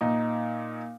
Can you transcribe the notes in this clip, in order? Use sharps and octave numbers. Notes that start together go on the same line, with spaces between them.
A#2 D#4